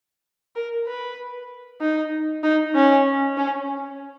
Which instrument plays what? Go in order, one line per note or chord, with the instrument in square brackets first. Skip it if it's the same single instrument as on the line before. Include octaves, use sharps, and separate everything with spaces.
[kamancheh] A#4
B4
D#4
D#4
C#4
C#4